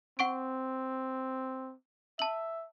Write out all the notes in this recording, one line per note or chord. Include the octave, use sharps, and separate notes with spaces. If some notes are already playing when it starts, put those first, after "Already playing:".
C4 F#5 C#6 D7
E5 A5 F#7